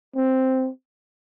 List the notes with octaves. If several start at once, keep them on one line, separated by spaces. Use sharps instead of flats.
C4